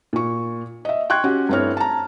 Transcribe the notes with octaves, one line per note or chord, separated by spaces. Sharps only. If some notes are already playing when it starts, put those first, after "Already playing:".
A#2 C#6
D#5 E5
G5 C6 C#6 F#6 G#6
C#4 F#4 G4
G2 A3 C4 E4 C#5 F6
A5 A#5